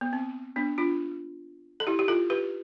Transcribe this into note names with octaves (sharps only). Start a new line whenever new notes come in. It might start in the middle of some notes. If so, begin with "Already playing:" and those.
B3
C4
B3 D4
D4 F4
A4
E4 G4
G4
F4 A4
G4 B4